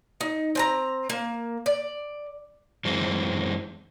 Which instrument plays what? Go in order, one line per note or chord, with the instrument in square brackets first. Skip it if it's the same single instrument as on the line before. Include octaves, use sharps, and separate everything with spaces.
[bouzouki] D#4
C4 A5 A#5
A#3
D5
[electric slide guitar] F#2 E3 G#3 C4